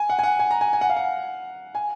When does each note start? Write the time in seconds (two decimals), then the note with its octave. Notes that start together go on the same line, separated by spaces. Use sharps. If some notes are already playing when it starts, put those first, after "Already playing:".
Already playing: G#5
0.10 F#5
0.19 G#5
0.23 F#5
0.39 G#5
0.51 A#5
0.61 G#5
0.73 G#5
0.81 F#5
0.90 F5
0.96 F#5
1.75 G#5